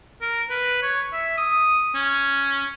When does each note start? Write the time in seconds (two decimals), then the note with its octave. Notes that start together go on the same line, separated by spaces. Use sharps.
0.21 A#4
0.50 B4
0.83 C#5
1.13 E5
1.38 D#6
1.95 C#4